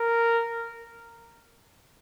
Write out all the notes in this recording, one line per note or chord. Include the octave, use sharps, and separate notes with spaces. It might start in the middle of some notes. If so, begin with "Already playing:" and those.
Already playing: A#4